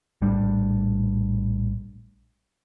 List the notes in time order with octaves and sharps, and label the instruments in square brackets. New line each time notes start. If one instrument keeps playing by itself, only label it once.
[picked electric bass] A#1 A2 G3 D4